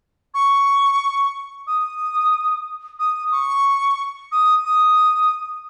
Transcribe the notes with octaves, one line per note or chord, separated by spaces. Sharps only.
C#6
D#6
D#6
C#6
D#6
D#6